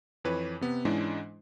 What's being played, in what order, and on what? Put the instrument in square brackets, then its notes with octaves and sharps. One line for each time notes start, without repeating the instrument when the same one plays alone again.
[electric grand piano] F2 E3 B4 C#5
C3 B3
G#2 E3 G#3 C#4 D4 E4